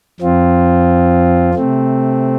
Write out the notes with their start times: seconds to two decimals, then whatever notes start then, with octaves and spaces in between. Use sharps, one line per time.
0.20 F2 F3 C4 F4
1.54 C3 A3 C4